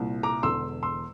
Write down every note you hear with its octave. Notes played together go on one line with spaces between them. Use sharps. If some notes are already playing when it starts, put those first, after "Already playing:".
Already playing: C2 A#2
A#5 D6
E1 E2 D3 C6 E6
C6 E6